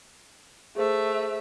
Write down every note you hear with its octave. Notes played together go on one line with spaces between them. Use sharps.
A3 G#4 C5 E5